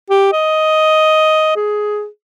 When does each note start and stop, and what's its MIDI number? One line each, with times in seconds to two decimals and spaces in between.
0.10 0.31 67
0.33 1.56 75
1.56 2.07 68